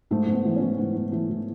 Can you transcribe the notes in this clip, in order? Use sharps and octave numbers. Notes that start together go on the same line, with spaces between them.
G#2 A3
G#2
B3
E3
C#4
E3
G#2 B3
G#2
E3 A3
E3